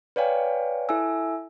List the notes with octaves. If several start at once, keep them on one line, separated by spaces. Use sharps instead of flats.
B4 C#5 D5 F5 G5 G#5
E4 A4 E5 G#5 E6